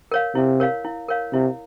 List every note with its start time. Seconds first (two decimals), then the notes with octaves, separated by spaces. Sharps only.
0.12 A#4 C#5 F5
0.35 C3 E4
0.60 A#4 C#5 F5
0.85 E4
1.08 A#4 C#5 F5
1.33 C3 E4